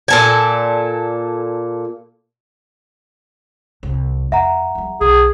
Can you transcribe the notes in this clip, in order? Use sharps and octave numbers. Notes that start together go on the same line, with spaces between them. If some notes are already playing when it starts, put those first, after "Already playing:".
A#2 A4 G#5
C2 C3
F2 E5 F#5 A#5
E2 F#3
B1 D4 G#4